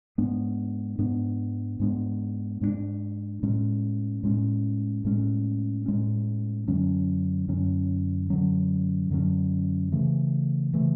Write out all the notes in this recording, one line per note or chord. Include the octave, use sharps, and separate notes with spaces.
G#2 G#3 B3 D4
G#2 G#3 B3 D4
G#2 G#3 B3 D4
G#2 G#3 B3 D4
A2 G#3 C#4
A2 G#3 C#4
A2 G#3 C#4
A2 G#3 C#4
F#2 D3 F#3 C#4
F#2 D3 F#3 C#4
F#2 D3 F#3 C#4
F#2 D3 F#3 C#4
C#3 E3 A3
C#3 E3 A3